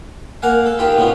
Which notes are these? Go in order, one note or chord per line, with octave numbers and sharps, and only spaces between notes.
A#3 F5 F#5 G#5
A4
D#3 F4 G4 B5
A2 B3 C#4 F4